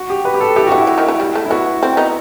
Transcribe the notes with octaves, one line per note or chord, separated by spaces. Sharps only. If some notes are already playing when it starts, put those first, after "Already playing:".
Already playing: F#4
G4
B4
G4
A4
E3 G4
E3 F#4
E4
E3
D#3
E3
G3
A3
E4
B3 F#4
C4
B3 D#4